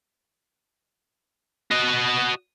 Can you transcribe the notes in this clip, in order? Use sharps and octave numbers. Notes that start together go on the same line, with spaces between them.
F#4 D#5